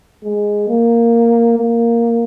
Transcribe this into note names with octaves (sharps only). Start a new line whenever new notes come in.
G#3
A#3
A#3